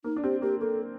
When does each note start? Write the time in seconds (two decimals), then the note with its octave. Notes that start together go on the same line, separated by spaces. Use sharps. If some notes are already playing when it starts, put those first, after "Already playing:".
0.04 A#3 D#4
0.16 D4
0.23 C4 G4
0.42 A#3 G4
0.61 A#3 A4